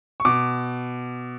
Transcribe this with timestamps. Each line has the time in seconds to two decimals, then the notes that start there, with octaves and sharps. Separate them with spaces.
0.20 C#6
0.25 B2 D6